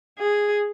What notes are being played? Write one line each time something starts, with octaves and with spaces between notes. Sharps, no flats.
G#4